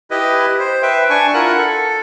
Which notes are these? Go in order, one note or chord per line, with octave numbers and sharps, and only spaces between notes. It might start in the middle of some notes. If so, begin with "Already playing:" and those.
E4 G4 B4 D#5
C5
B4 E5 G5
D4 G#5 C#6
E4 F4 A#4 F#5 F#6
A4